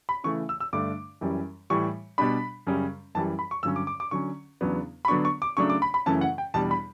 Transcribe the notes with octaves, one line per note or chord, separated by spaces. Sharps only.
B5
C#3 E3 A3 C#6
E6
E6
G2 D3 A3 D4 D6
F#2 E3 G3 C#4
A2 E3 G3 C#6
B2 G3 D4 B5
F#2 C#3 G3 C#4
F#2 E3 G3 A5
B5
C#6
G2 D3 F#3 C#4 E6
D6
D6
D6
D3 F#3 C#4 C#6
E2 C#3 F#3 B3 D4
B5
D3 F#3 B3 D4 C#6
C#6
D6
C#3 F#3 A3 D4 C#6
D6
B5
B5
F#2 C#3 E3 A3 C#4 A5
F#5
G5
E2 B2 G3 D4 A5
B5